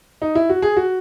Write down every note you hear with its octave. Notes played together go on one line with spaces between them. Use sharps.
D#4
E4
F#4
G#4
F#4